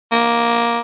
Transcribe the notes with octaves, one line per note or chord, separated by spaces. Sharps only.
A#3